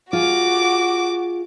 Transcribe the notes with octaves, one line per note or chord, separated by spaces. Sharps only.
F4 F#4 G#4 D6